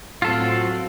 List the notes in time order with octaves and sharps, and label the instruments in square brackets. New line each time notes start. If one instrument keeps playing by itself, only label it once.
[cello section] A2 F#3 C4 [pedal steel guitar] F4 A4